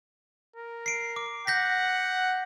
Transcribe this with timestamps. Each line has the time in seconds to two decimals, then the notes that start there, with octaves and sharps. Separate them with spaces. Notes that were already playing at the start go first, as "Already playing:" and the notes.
0.56 A#4
0.86 C7 D7
1.16 D6
1.47 F#5 G6 A#6 B6